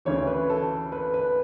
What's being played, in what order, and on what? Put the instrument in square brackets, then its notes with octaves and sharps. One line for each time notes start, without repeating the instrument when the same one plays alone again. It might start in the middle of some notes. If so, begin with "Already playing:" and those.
[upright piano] D2 C#3 E3 C#5
B4
A4
B4
B4